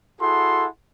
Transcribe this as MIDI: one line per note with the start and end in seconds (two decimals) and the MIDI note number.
0.21 0.66 64
0.21 0.66 66
0.21 0.66 68
0.21 0.66 69
0.21 0.66 78
0.21 0.66 84